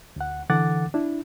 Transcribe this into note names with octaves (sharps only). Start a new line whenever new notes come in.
D2 F#5
D3 E3 A4 F#5 D6 A6
D4 E4